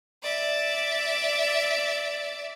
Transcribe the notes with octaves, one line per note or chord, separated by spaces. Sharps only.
D5 E5